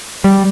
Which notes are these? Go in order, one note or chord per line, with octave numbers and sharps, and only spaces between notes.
G3